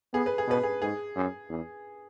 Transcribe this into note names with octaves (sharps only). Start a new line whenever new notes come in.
B3 G#4
B4
G#4
B2 B4
G#4
G#2 G#4
F#2
E2